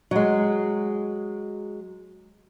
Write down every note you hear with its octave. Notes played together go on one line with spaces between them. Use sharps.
F#3 G#3